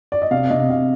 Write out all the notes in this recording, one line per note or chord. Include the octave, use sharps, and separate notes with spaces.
D5
D#5
C3 F5
C3 D#5
C3 F5